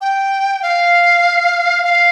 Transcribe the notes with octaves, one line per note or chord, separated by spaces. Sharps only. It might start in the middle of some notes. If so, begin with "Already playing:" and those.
G5
F5
F5